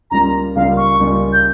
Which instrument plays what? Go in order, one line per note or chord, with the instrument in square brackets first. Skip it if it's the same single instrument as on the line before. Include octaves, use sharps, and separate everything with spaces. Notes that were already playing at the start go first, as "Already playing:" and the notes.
[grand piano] C#2 C#3 G3 A#3 F4 [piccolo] A#5
[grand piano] C#2 C#3 G3 A#3 F4 [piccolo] F5
[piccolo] C#6
[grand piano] C#2 C#3 G3 A#3 F4
[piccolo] G6